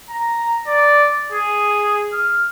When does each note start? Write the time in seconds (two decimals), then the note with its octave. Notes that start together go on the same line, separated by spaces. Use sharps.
0.10 A#5
0.67 D5
1.32 G#4
2.13 F6